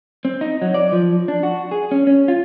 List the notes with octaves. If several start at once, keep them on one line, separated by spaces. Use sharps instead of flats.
C4
D#4
F#3
D5
F3
D4
F#4
G#4
C#4
C#4
F4